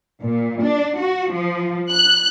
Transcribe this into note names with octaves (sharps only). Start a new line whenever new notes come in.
A#2
D4
F#4
F3
F#6